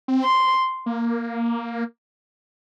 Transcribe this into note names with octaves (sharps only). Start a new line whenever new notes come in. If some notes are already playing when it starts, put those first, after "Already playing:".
C4
C6
A#3